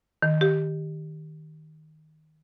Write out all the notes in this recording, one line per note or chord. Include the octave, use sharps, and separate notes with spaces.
D#3
G4